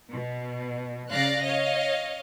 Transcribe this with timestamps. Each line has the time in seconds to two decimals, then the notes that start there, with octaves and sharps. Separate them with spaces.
0.11 B2
1.12 C#3 D5 F5 F#6 A#6
1.45 C#5 D#5 F5